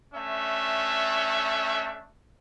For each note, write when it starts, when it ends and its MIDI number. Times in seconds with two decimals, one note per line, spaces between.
0.14 2.09 57
0.14 2.09 61
0.14 2.09 62
0.14 2.09 76